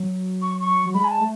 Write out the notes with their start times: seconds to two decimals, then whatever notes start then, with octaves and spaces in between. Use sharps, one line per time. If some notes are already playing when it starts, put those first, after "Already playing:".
Already playing: F#3
0.42 C#6
0.61 C#6
0.86 F#3
0.94 G#3 B5
1.04 G#5
1.11 A5
1.20 A3